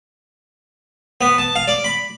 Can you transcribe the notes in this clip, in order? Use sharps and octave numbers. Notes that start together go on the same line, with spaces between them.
B3
A5
F5
D5
B5